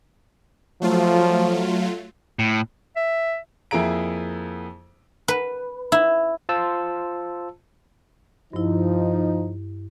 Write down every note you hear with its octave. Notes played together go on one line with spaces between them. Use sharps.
F3 F#3 A3 F4
A2
E5
F2 A#3 E4 G#4 A#5 D7
B4
E4
F4 C5 A5 E6
G2 F3 D#4 E4